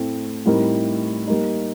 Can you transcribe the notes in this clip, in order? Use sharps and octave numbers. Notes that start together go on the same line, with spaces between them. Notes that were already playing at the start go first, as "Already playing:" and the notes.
Already playing: A2 A3 C4
A2 G3 C4 D#4 A#4
G3 A#3 D#4